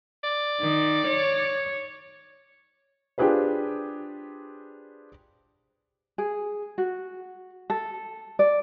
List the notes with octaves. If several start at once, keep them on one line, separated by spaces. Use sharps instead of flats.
D5
D#3
C#5
D4 F4 G4 G#4 B4 C5
G#4
F#4
A4
D5